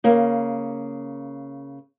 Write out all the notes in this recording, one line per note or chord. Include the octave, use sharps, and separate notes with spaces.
C#3 A#3